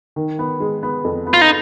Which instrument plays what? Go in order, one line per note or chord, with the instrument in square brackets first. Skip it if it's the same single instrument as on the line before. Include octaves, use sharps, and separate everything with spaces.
[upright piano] D#3
B3
G#3
B3
F2
B3
[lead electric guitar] F4
D#4